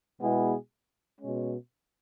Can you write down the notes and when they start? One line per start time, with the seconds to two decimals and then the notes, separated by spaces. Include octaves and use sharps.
0.21 B2 G#3 B3 E4 G#4
1.19 B2 G#3 C#4